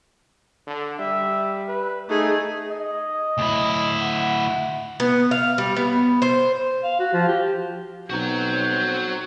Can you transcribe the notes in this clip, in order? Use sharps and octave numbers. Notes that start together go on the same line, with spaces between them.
D3
G3 E5
B4
A3 D#4 G#4
D#5
D2 E4
F#5
B3
F5
G3
B3
C5
F5
F#4
F3
G4
B1 C4 F#4 A#5 G6